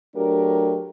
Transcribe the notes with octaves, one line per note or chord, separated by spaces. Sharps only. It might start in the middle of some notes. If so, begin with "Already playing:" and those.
F#3 A3 D4 G4 A#4